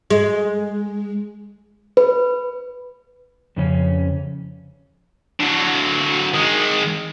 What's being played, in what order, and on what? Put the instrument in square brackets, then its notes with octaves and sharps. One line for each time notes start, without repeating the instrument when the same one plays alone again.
[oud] G#3
[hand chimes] B4
[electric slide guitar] F2 C#3 C#4
[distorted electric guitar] D3 F#3
D#3 G#3